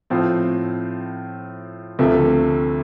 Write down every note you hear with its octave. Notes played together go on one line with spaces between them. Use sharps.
A2 F3 C4
D2 C3 F3 A3